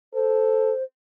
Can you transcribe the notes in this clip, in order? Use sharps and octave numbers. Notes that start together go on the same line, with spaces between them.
A4 C5